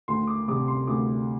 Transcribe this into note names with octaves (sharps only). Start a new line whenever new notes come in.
D2 C6
D6
C3 G3 D6
C6
D2 D6